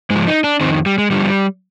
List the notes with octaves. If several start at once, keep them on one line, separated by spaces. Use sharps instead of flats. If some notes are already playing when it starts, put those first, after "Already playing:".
G#2 F3 G#3
D#4
D4
F2 D#3 C4
G3
G#3
G2 D3 F3 G3